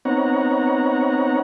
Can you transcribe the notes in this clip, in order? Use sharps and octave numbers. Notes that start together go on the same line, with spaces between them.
B3 C4 D#4 C#5 F#5 A#5